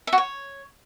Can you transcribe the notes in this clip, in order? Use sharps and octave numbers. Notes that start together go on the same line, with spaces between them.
E5
F#4
C#5